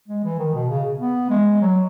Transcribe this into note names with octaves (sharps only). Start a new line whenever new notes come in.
G#3
E3
D#3
B2
C#3
B3
G#3
F#3